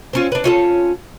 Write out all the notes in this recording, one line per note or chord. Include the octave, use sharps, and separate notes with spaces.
C4 C#4 F4
D4 B4
C#4 F4 A4